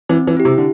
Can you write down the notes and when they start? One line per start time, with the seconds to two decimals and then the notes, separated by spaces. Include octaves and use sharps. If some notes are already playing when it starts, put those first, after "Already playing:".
0.09 E3 C4
0.27 E3
0.37 E4 G4
0.45 C3
0.58 D3